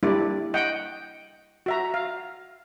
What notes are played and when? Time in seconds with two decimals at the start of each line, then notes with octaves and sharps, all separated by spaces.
0.03 G3 A#3 D4 E4 D5
0.54 D#5 F#5 G5
1.66 F#4 E5 A#5
1.94 F5